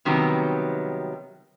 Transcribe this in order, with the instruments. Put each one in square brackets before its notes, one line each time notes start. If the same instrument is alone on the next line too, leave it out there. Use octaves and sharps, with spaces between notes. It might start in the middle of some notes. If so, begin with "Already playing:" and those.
[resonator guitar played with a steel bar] C3 D#3 F#3 G3 B3